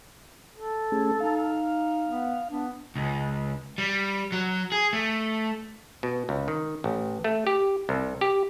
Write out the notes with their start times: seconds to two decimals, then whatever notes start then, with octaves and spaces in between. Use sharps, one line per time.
0.54 A4
0.92 A3 C#4 G#4
1.20 D#4 F5
2.08 B3
2.50 B3 D4
2.96 C#2
3.78 G3
4.32 F#3
4.72 G#4
4.93 A3
6.03 B2
6.29 C#2
6.48 D#3
6.84 A1
7.24 A3
7.47 G4
7.89 C2
8.21 G4